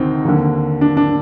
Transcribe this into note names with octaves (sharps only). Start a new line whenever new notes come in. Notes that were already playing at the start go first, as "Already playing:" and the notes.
Already playing: D2 C3 D#3 C4 D#4
D#2 D3
D4
D4